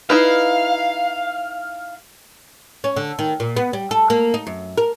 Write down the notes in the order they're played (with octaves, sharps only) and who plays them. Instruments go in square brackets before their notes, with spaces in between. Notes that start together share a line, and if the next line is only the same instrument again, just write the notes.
[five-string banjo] D#4 E4 B4 [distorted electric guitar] F5
[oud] C#4
D3
D#3
A#2
B3
G3
A4
A#3
D#4
F#2
A#4